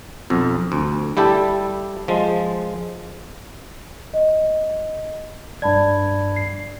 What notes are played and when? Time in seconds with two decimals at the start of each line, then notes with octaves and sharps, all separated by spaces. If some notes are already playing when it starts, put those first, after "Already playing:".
0.30 B1 F2
0.72 D2
1.17 G3 E4 G4 A4
2.08 F3 G#3
4.14 D#5
5.62 G2 D5 A5 B5 G#6
6.36 C7